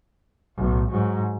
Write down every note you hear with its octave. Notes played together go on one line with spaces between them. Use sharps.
B1 A2
G#2 F#3